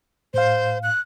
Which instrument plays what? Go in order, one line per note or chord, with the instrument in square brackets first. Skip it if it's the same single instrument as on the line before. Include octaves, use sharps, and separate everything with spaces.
[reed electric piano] A2 F5 [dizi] C5
[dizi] F#6